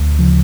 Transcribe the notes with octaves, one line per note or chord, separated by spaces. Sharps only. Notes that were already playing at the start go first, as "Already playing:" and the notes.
Already playing: D2
C#3 F3